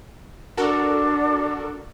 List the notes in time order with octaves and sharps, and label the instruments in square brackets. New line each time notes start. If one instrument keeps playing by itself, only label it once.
[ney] D4 [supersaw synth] F#4 A4 A#4